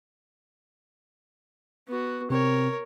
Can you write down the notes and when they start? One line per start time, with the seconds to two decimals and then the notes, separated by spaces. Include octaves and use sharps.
1.88 B3 F#4
2.30 C3 C4 A#4 C#5